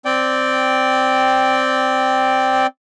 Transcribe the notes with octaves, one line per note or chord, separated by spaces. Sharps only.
C4 D5 G5